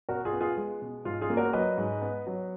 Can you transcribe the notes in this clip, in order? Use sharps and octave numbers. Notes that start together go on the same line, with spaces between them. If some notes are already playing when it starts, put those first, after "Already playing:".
B2 F#4 A#4
F4 G#4
B3
F4 G#4
G#3
B2
G#2 F4
F4 G#4
A#3
F#4 A#4
F#3 B4 D#5
G#2
B3
F#3